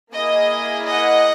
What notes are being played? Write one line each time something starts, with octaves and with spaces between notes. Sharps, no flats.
A#3 E4 G#4 D#5
D#5 F#5